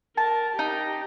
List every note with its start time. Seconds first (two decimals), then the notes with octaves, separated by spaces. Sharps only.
0.17 A#4 A5
0.59 D#4 G4